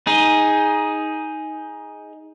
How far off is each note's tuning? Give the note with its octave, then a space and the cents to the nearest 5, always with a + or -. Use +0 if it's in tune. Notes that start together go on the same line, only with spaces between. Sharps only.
D#4 +15 G#4 +0